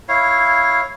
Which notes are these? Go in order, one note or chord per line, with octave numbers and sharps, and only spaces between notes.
E4 C#5 F5